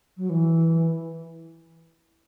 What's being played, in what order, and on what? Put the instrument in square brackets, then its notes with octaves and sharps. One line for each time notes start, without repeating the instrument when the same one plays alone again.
[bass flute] F#3
E3